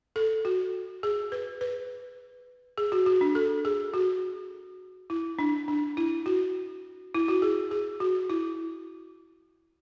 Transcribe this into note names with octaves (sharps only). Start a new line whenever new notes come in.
A4
F#4
G#4
B4
B4
G#4
F#4
F#4
D4
A4
G#4
F#4
E4
D4
D4
E4
F#4
E4
F#4
G#4
G#4
F#4
E4